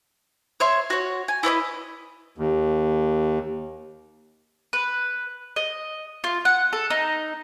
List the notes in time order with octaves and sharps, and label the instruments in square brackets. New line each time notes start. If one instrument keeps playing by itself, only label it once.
[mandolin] C#5 E5 C6
F#4 C#5
G#5
E4 B4 C#5 D#5
[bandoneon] D#2
[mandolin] B4
D#5
F4
F#5
A4
D#4